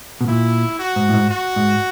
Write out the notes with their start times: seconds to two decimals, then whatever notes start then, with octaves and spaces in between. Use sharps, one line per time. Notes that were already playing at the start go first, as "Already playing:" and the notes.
0.21 B2
0.28 A#2 E4
0.79 F#4
0.96 G#2
1.09 A2
1.14 G#2
1.31 F#4
1.56 G#2